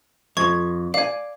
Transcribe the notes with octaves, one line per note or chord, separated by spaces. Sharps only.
F2 C#6 G#6
D5 F5 G#5